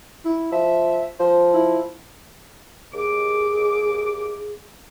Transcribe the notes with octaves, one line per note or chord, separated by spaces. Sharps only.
E4
F3 E5
F3 C5
E4
D#2 G#4 D6